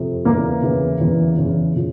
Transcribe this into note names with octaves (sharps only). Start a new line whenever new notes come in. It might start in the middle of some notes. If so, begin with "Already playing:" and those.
Already playing: F2 C3
E2 C#3 E3 A#3
E2 C#3 E3
E2 C#3 E3
E2 C#3 E3
C#3 F3